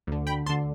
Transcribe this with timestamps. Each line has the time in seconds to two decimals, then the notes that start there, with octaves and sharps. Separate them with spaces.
0.07 D2 D3
0.27 G5 B5
0.46 D2 A5 C6
0.49 D3